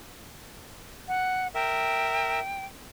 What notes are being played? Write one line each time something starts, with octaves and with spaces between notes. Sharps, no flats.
F#5
A#4 E5 G5